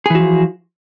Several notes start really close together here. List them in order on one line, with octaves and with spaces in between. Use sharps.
G#4 E3 F#4 F3